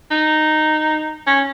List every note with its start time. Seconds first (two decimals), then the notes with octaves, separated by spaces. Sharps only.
0.11 D#4
1.27 C#4